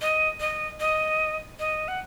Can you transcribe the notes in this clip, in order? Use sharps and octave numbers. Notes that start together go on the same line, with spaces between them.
D#5
D#5
D#5
D#5
F#5